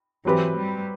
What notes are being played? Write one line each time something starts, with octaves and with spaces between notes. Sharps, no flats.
E3 F#3 C4 G4 B4
G3